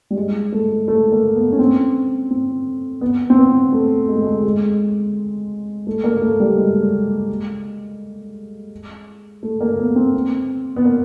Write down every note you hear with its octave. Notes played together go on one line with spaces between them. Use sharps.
G3
G#3
A3
A3
A#3
B3
C#4
C4
C4
B3
C4
B3
A3
G#3
A3
G#3
G#3
A3
A#3
A3
G3
G#3
A3
A#3
B3
C4
B3
A#3